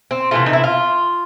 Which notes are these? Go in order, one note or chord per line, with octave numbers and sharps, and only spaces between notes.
C4
C3 E3 A3 F4
D#4
E4
F4